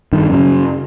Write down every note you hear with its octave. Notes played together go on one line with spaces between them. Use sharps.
G2 D#3
F#2 C#3